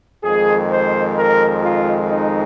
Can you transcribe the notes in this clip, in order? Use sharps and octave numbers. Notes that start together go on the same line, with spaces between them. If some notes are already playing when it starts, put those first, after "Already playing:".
F2 D#3 G#3 G#4
C5
A#4
F4
D#4